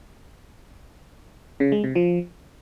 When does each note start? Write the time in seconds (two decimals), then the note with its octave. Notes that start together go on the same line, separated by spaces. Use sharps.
1.60 C#3
1.72 G#3
1.84 C3
1.95 F3